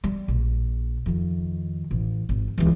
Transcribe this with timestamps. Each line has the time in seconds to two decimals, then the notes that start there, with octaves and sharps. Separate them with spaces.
0.04 G3
0.28 A#1
1.06 F2 D#3
1.91 A1
2.29 G#1
2.58 C#2 E3